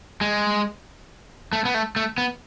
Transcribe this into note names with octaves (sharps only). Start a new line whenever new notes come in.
G#3
A3
B3
A3
A3
B3